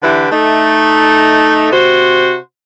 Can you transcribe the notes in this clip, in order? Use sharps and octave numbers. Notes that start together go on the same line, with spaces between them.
D3 E3 E4 G4 B4
A3 D#4
C3 F#4 C5